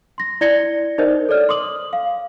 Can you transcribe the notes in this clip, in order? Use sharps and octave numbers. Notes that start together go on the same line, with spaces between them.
C6 A#6
E4 D5 G#6 A#6 C#7 G7
D#4 A#4 C5 D5 D#5 G6
A4 C#5 D5 F6
C6 D6 D#6 F#7
F5